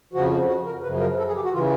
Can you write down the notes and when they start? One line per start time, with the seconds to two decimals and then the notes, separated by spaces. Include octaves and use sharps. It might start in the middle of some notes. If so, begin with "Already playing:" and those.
0.13 F2 C#3 F3 F#4
0.48 F#4
0.66 A#4
0.83 F#2 C#3 F3 B4
1.00 A#4
1.18 A4
1.27 G#4
1.35 G4
1.44 F#4
1.53 C#3 E3 F4